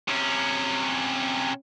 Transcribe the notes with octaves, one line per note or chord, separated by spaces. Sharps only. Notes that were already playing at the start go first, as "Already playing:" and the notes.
C3 C#4